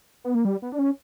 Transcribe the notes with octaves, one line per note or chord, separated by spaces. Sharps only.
B3
A#3
G3
B3
D4
C#4